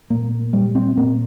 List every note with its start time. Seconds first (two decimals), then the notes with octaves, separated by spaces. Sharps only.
0.10 A#2 A#3
0.53 A#2 G3
0.75 C4
0.97 A#2 A#3